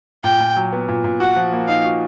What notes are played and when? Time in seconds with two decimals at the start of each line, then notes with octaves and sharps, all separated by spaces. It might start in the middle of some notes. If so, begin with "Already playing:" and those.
0.24 A#2 G5
0.40 A#2
0.56 F#3
0.73 B3
0.88 A#2
1.04 A#2
1.20 F#4 F#5
1.36 F3
1.53 A#3
1.68 D#4 F5
1.84 F#4